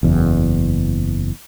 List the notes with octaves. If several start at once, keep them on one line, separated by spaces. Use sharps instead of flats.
F#1 E2